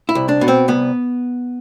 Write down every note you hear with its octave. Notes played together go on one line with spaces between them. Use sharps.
E4
C2
D4
B2
C4
C2 B3